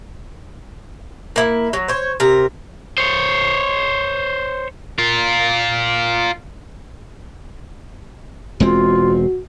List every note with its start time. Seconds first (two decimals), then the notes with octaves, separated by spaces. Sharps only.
1.36 A#3 E4
1.73 F#3
1.88 C5 C#5
2.20 C3 A#4
2.98 C5 C#5
4.99 F4 A#4
8.60 E1 G#3 C4 F4 F#4